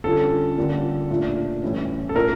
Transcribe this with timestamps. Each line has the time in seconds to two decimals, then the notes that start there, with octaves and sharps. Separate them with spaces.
0.04 D3 G3 C#4 F4 A4
0.57 D3 G3 A#3 D4 F4
1.10 A#2 A3 D4
1.62 A2 E3 G3 C#4 E4
2.09 A4
2.15 A#2 A3 E4 A#4